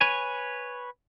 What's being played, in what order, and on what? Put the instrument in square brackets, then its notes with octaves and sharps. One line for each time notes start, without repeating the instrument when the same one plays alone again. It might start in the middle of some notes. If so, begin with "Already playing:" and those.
[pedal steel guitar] B4 C#5 G#5